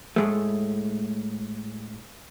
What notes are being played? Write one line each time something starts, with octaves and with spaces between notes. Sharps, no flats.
A2 G#3 A3